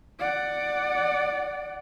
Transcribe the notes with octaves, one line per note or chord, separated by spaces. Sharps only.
D5 F#5